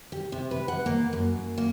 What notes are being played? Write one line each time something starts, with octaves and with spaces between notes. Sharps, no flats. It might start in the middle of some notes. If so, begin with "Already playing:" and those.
G4
C3
B4
F#5
A#3
F#2
A#3